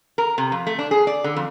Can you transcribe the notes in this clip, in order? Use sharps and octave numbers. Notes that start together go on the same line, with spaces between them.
A#4
C3
F2
A3
D4
G#4
D5
D3
F2